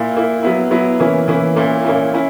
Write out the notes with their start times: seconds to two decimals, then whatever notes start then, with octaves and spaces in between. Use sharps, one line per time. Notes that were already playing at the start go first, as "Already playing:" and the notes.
Already playing: A#2 A#3 E4
0.13 A#2 A#3 E4
0.43 F#3 B3 E4
0.71 F#3 B3 E4
1.00 E3 A#3 C#4 E4
1.28 E3 A#3 C#4 E4
1.56 A#2 A#3 C#4 E4
1.85 A#2 A#3 C#4 E4
2.14 C#4 E4